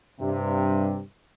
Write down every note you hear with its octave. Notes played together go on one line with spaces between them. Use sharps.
G2 C3